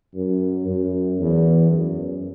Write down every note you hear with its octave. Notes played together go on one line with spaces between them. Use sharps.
F#2
F#2
E2
F#2